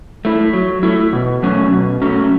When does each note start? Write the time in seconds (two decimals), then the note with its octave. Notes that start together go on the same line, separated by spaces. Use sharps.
0.25 A3 E4
0.53 F#3
0.83 A3 E4
1.13 B2
1.43 F#3 A3 C#4
1.72 B2
2.02 F#3 A3 C#4